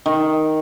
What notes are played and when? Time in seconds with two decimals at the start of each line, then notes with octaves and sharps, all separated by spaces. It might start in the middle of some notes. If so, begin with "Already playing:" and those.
0.06 D#3